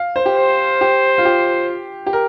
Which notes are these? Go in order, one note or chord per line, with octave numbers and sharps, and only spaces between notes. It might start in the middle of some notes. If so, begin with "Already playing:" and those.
Already playing: F5
C5
G4
C5
G4
F4
G4
G4
A#4